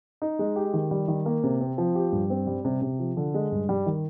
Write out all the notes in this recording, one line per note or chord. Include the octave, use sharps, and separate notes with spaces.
D#4
G#3
G4
D#3
G3
D#3
A#3
C3
C4
F3
G4
G2
C4
G3
C3
C3
F3
D3
G#3
G2
G3
D#3